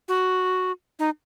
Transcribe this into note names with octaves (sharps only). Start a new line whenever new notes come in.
F#4
D#4